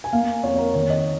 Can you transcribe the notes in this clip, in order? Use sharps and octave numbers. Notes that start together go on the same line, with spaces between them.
G#5
A#3 F5
F2 C#5
A#4
D#3 C#5
D#5